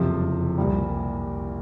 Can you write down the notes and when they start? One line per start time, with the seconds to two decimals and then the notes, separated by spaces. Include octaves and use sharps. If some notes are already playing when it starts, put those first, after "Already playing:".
Already playing: F#1 F2 C3 F3
0.58 C2 A#2 G3